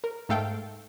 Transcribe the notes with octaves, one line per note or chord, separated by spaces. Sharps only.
A#4
G#2 A3 A4 F5 G5